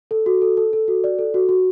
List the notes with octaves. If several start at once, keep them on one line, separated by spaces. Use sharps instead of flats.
A4
F#4
A4
A4
A4
F#4
D5
A4
F#4
F#4